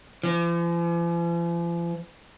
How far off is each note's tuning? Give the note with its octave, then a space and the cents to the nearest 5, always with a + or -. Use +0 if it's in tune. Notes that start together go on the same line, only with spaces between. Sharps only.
F3 -45